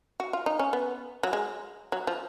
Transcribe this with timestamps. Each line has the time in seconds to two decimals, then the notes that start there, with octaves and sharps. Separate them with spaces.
0.20 F#4
0.33 F4
0.46 D#4
0.59 C#4
0.73 B3
1.23 F#3
1.33 G#3
1.92 F#3
2.07 F3